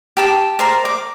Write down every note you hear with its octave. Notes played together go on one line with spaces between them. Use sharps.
G4 A5 D6
A#4 C5 D5
D6